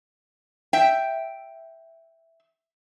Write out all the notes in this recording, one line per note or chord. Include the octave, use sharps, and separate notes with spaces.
E5 G5